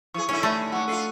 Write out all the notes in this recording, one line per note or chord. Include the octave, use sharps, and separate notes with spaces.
E3 G#4 C#6
D#2 D3 C#4 E4
A3
D#2 G#3 F#5 C#6
D4 F4 A4 C7